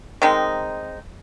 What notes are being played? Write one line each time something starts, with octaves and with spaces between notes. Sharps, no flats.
D#3 G#3 C4 D#4